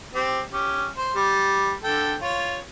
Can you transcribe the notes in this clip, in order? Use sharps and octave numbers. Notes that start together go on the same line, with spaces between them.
C4 G4
C#4 G4
C5
G3
D3 A4 G5
F4 C#5